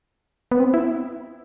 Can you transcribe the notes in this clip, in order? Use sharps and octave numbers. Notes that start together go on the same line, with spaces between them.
B3
C4
E4